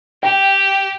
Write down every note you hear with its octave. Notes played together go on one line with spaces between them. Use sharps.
G4 G5